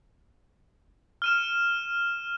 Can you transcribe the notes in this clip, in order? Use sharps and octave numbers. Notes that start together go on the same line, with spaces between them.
F6 D#7 E7